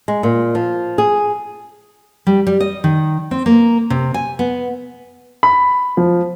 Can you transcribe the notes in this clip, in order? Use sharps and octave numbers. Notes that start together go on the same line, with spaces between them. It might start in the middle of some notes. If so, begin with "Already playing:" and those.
G#3
A#2
F3
G#4
G3
G3
D#5
D#3
C4
A#3
C3
G#5
B3
B5
F3